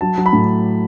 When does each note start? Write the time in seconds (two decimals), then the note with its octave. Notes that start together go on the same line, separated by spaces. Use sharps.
0.01 F#3 A5
0.18 F#3
0.26 B5
0.33 A2